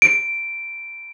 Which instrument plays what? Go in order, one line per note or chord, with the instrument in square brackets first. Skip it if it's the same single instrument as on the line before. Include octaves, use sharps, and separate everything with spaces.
[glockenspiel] D7